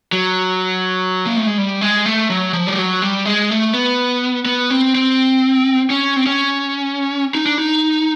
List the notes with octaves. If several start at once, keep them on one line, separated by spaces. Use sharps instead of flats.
F#3
A#3
A3
G#3
G3
G#3
A3
F#3
F3
G3
F#3
G3
G#3
A3
B3
B3
C4
C4
C#4
C4
C#4
D#4
D4
D#4